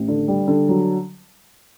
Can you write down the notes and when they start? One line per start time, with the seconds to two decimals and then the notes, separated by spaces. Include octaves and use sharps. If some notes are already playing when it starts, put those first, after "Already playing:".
Already playing: A1
0.08 D3
0.28 G3
0.48 D3
0.69 F#3